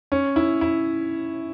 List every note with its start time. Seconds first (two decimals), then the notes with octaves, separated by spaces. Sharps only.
0.12 C#4
0.36 E4
0.61 E4